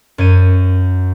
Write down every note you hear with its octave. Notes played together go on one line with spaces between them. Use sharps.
F#2 C#5 D#7